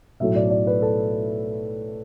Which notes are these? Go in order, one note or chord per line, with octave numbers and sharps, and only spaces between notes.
B1 A2 F#3 A3 E5
D5
D5
B4
A4